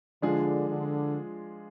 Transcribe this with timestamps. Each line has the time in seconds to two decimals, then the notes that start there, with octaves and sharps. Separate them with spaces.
0.22 D3 F3 G#3 D4 F4 G#4
0.69 D3